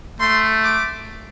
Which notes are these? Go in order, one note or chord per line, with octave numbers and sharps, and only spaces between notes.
A3 C6
D6